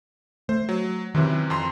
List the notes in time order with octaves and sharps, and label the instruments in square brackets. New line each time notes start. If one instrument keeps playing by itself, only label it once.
[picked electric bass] A3 [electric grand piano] C5
[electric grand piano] F#3
[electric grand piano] F#2 C3 E3 [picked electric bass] D#3
[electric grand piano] F2 A#5 C6